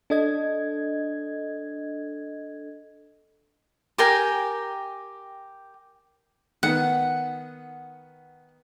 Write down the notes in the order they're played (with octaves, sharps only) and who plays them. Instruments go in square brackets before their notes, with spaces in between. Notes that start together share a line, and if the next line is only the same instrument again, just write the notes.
[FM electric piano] D4 A4 D#5 G#6
[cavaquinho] G4 A#4 G5 G#5
[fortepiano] D#3 B3 [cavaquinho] F#5